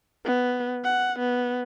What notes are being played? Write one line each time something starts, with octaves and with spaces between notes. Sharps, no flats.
B3
F#5
B3